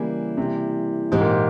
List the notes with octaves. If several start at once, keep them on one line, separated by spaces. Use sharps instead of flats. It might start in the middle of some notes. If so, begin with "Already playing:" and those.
Already playing: C#3 E3 G3 A#3 E4 G#4
C3
G#2 E3 G#3 C4 G4
A#2